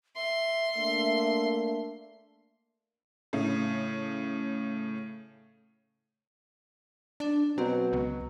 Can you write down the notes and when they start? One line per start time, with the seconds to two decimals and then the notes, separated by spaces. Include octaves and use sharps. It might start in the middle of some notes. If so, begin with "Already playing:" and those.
0.16 E5 C6
0.76 A3 A#3 D4
3.33 A2 C#3
7.20 D4
7.58 B2 F#3 C4
7.93 C#2